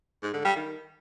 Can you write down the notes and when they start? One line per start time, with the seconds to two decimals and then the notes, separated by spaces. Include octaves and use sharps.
0.22 G#2
0.34 D3
0.45 G3
0.56 D#3